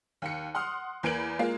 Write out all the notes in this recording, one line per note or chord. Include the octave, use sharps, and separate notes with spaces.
D#2 C#7
F#5 C6 D#6 F6
E2 A#3 B4 G#6 D7 F#7
G#3 A#3 F4